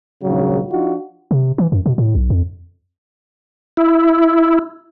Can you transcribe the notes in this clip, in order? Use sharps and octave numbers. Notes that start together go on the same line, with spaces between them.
A#1 D#2 G#2 C#3 F#3
F3 D4 D#4 F4 F#4
C3
E3
F#2
B2
A2
B1
F2
E4